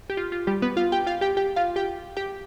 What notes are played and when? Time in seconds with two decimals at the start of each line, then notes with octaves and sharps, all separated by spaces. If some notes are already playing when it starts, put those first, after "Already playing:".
0.10 G4
0.17 F4
0.32 F4
0.47 G3 G4
0.62 B3 B4
0.77 F4 F5
0.92 G4 G5
1.07 F4 F5
1.21 G4 G5
1.37 G4 G5
1.56 F4 F5
1.76 G4 G5
2.17 G4 G5